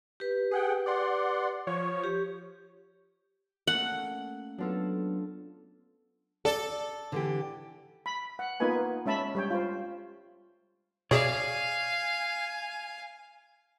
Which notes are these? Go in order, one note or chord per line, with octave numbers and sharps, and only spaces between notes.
G4 B4
G#4 F#5 G5
D5 F#5 C6
F3 C#5
G4
A3 A#3 C#4 F#5
F#3 B3 D4 F4 A4
A4 D5
D3 E3 G4
B5
F#5
A#3 B3 D#4 F4 B4 G#5
G#3 C#4 E5 A5 B5
G3 C#5 G5
F4 C5
B2 G#4 C#5 D5 F5 G#5